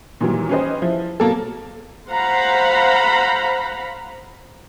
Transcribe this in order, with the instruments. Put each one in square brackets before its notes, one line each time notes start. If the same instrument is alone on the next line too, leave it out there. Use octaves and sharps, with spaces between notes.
[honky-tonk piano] A#2 D#3 E3 F#3 G3
C#4 G4 G#4 B4 C5 D#5
F3 E4
B2 F#3 A#3 A4
[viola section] C5 F5 F#5 A#5 B5